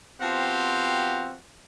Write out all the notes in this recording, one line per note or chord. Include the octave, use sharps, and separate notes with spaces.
F3 B3 C4 F#4 G4 F5